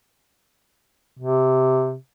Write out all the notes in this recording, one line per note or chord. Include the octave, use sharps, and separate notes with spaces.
C3